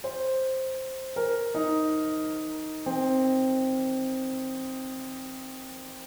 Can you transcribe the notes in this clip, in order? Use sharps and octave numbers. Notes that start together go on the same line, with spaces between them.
C5
A#4
D#4
C4